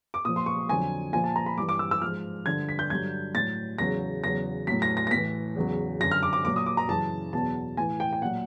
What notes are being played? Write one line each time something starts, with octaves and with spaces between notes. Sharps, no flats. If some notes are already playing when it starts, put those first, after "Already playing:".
D6
A#2 F3 D#6
C6
C#6
F2 D3 F#3 G#5
A#2 F3 G#5
A5
A#5
B5
G2 E3 D6
D6
E6
E6
G#2 F3 F6
G2 D3 F3 G#6
B6
G6
G2 D3 F#3 G#6
A2 F#3 A6
E2 C#3 F#3 A#6
E2 C#3 F#3 A#6
A2 F#3 B6
A#6
A#6
A#6
A2 E3 B6
E2 C#3 F#3
F#2 D3 F#3 A#6
F6
D6
D6
A#2 F#3 D6
D#6
D6
A#5
F#2 C#3 E3 A5
E2 B2 F#3 A5
A2 E3 G#5
G5
G5
A#2 F#3 F#5